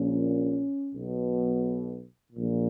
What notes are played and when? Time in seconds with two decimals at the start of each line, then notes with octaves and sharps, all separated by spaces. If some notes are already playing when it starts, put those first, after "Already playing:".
Already playing: A#1 A#2 C#4
0.94 B1 B2
2.33 A#1 A#2